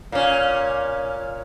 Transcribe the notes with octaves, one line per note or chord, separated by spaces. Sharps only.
A#2 C#4